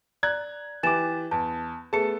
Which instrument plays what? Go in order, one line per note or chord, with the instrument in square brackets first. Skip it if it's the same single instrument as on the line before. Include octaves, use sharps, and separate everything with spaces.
[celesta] D5 [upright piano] A#5 F#6 G#6
[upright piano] E3 G4 D6 [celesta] G#5 A6 E7
[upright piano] E2 [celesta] A5
[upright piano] A3 B3 A5 [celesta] G#4 C#7